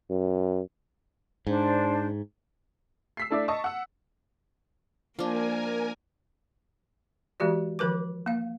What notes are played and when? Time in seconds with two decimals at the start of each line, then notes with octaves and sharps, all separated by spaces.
0.10 F#2
1.47 G#2 D4 C5
3.17 E6 B6 C7
3.30 A3 D4 E4 D5
3.48 D#5 A5 C#6
3.64 F#5 E6
5.19 F3 A#3 D4 A#4 G#5
7.40 E3 G#3 F#4 G4 D5
7.79 D#3 F3 A#4 B4 D6
8.26 A#3 F5